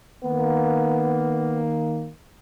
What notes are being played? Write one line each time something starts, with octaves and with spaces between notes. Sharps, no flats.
D#3 A#3 B3